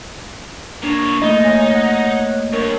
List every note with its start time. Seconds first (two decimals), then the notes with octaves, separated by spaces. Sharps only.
0.83 A#3 D4 C#5
1.22 A3 A#3 D#4 E4 D#5
1.44 C#5 G#5
1.75 F#5
2.52 G2 A#4 C#5